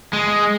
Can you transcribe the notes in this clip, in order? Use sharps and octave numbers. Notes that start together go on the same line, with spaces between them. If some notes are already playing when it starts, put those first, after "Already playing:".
G#3